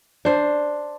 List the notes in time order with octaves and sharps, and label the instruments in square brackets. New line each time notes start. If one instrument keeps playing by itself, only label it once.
[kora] D4 C5